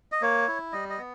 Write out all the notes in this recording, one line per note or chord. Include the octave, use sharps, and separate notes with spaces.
D#5
A#3 C#5
E4
G3 D#5
D#5
B3